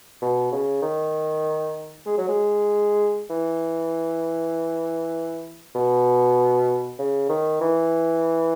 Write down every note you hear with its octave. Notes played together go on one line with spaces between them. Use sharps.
B2
C#3
D#3
G#3
F#3
G#3
E3
B2
C#3
D#3
E3